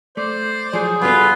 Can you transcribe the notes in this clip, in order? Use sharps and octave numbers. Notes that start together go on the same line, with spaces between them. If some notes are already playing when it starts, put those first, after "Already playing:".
A3 C5 D5
F3 F#3 G#4
G2 C#3 B3 F4 F#4 A4 B4